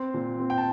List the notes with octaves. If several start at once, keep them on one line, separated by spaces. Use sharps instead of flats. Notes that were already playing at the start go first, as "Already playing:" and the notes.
Already playing: C4 C6
A#2
C4
G5
A5